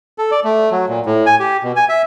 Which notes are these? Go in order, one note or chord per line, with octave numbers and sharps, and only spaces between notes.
A4
D5
A3
F#3
A#2
A2
G#5
G4
B2
G#5
E5